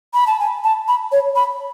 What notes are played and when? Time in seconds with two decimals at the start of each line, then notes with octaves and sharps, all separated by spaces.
0.14 B5
0.27 A5
0.40 G#5
0.64 A5
0.88 B5
1.12 C#5
1.36 B5